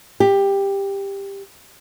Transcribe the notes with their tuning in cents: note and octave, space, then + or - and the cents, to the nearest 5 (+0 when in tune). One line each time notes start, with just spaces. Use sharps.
G4 +10